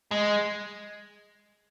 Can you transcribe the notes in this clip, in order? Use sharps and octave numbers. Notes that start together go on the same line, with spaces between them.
G#3